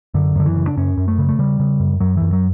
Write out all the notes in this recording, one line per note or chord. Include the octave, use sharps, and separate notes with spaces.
F#2 D3
F#2 D3
E3
C#3
D4
F#2 C#4
F#2
A3
C#3
A3
C#3 G3
C#3
F#2
F#2 F#3
F#2 E3
F#3